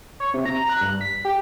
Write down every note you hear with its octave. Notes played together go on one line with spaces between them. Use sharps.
C#5
C3
A#5
F#6
G2
B6
G4